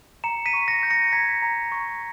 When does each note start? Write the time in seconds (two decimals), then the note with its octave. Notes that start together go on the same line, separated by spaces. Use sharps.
0.24 A#5 C#7 E7
0.46 B6 D#7
0.53 C#6
0.68 A#6 C#7
0.83 G6
0.90 A#6 C#7
1.12 A#5 G#6 B6
1.42 A#5
1.72 C#6